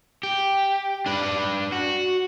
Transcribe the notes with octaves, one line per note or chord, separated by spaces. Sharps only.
G4
D4 B4
F#4